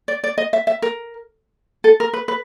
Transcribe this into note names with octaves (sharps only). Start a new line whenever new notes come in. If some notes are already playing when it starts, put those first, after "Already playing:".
D5
D5
D#5
E5
E5
A#4
A4
A#4
B4
B4